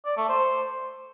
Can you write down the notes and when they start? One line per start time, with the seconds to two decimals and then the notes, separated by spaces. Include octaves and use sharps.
0.05 D5
0.17 A3
0.29 C5